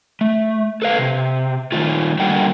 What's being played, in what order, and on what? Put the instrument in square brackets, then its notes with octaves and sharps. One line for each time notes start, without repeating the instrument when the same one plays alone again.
[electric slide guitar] A3
A4 B4 F5
C3
D#3 A3 D#4 F4
D3 G3 A#3 F#4 G5